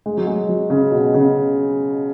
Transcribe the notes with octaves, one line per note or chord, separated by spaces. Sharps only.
G#3
F#3
G#3
F#3
C#3
B2
C#3